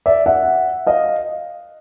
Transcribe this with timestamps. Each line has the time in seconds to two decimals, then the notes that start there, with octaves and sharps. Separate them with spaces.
0.06 D5 E5
0.26 E5 F#5
0.87 D#5 F5